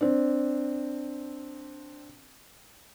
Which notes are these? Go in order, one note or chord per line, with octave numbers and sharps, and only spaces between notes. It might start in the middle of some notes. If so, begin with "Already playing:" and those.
C4 D4